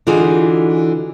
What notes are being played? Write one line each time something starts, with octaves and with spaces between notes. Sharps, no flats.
D3 E3 D#4 F4 F#4 G#4